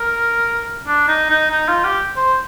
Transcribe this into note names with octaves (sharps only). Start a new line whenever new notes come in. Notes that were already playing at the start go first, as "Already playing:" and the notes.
Already playing: A#4
D4
D#4
D#4
D#4
F4
G4
C5